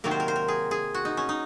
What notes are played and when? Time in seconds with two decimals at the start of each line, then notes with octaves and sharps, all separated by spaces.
0.04 C3 D#3 F#3 A#3 A#4
0.11 C5
0.20 A#4
0.28 C5
0.36 A#4
0.48 G#4
0.71 G#4
0.94 F#4
1.05 D#4
1.17 C#4
1.29 D#4